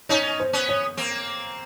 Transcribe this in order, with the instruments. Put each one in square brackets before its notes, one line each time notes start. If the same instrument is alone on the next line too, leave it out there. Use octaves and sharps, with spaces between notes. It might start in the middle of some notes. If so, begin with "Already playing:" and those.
[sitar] C#4 D#4 [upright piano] C#5
[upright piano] C5
[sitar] B3 C#4
[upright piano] C#5
[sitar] A#3 C4